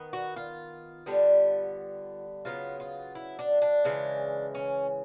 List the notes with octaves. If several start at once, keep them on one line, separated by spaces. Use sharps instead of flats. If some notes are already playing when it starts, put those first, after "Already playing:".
Already playing: D#3 B3
F#4
F4
D3 G3 B3
C#3 F#3 B3 F4
F4
E4
D4
D4
C#3 E3 G#3
C#4